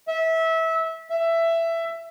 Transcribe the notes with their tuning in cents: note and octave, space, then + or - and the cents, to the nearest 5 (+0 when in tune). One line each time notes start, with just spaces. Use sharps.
E5 -20
E5 +15